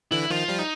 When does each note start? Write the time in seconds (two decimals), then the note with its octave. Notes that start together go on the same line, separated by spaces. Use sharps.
0.11 D3 E3 E4
0.30 D#3 F3 F4
0.49 F3 G3
0.59 D#4